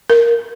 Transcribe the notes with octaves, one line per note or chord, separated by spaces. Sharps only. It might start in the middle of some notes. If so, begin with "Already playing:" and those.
A#4